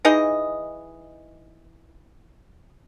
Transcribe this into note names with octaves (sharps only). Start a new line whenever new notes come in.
E3 D#4 G#4 D#5